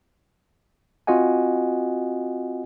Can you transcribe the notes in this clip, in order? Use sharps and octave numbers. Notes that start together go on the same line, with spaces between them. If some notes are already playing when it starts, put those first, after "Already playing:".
C4 F4 F#4 D#5 F#5 G#5